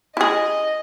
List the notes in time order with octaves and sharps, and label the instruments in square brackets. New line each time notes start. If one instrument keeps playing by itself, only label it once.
[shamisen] E4 G#4 [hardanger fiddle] D#5